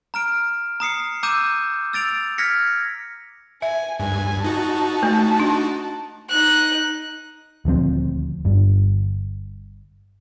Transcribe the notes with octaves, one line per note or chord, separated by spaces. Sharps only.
A#5 F6 D7
A#5 D#6 C7 C#7
A#5 D6 E6 G6 D#7 E7
E6 A6 D7 F7
F6 G#6 A#6 B6 C#7
E5 G#5
G2 G#5
D#4 F#4 A5
A3
D4
D#4 F#6
D#1 D2 F3 C4
G1 G2